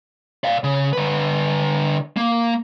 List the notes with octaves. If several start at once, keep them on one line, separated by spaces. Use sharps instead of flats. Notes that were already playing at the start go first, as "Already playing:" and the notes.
D5 F5
C#3
D3 B4
A#3